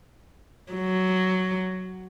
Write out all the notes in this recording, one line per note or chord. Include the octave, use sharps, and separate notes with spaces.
F#3